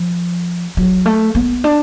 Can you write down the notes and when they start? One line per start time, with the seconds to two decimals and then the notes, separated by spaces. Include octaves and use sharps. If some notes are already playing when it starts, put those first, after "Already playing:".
Already playing: F3
0.77 F#3
1.06 A3
1.35 B3
1.64 D4